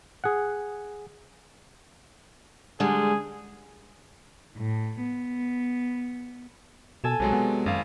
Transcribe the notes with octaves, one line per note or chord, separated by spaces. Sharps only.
G#4 F#5
D3 G3 G#3 G#4
A2
B3
B2 A4 G#5 E7
B1 C3 F#3 G#3
B3
G#1 F#2 F5